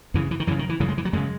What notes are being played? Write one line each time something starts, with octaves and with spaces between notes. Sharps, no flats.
F#2 C#3 E3
E3
D#3
F#2 C#3 E3
D#3
E3
F#2 C#3 E3
G#3
E3
F#3
F#2 C#3 G#3